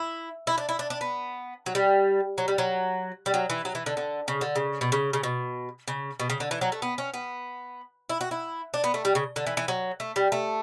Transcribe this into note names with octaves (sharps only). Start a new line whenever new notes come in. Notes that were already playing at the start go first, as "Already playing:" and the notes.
Already playing: E4
E4
D4
E4
D4
D4
B3
F#3
G3
F#3
G3
F#3
G3
F#3
E3
F#3
E3
D3
D3
C#3
D3
C#3
B2
C#3
C#3
B2
C#3
B2
C#3
D3
E3
F#3
A3
B3
C#4
B3
E4
F#4
E4
D4
B3
A3
G3
C#3
D3
E3
E3
F#3
A3
G3
A3